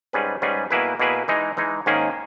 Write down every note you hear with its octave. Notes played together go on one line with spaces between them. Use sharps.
G#2 G3 C#4 G#4 B4
G#2 G3 C#4 G#4 B4
B2 A#3 E4 G#4 B4
B2 A#3 E4 G#4 B4
E3 G#3 D#4
E3 G#3 D#4
G#2 D#3 A#3 C#4 G#4